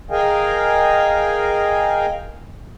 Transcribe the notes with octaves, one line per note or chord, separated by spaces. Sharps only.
G#4 A#4 D#5 F5 G5 G#5